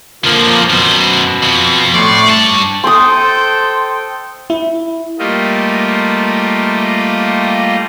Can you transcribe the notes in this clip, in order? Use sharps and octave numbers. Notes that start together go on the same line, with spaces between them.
A#2 D3 F3 A#3
F#2 B2 C5
F2
A2 D5 C6 C#6
G2 A5 C#6
A4 C5 G5 C6 D#6
E4
G3 A3 A#3 F4 D#5